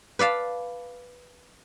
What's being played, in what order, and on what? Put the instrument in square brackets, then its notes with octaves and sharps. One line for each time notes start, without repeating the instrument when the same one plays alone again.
[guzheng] B4 D5 F5 A5